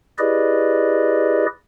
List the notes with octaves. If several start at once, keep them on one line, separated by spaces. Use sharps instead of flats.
E4 G4 G#4 B4 D5 D#5